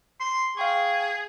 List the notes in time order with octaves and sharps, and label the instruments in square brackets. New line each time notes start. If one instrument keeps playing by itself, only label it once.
[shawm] C6
[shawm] G#4 [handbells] F5 G5 C#6